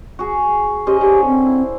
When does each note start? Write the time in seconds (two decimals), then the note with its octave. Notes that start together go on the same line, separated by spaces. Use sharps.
0.19 F#4 G#4
0.87 C#4 G4 C5 D#5
1.01 D3 G4
1.26 C4
1.46 E4